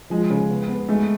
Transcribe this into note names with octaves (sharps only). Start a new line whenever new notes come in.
F3 G#3
C#3
B3
B3
G#3 A3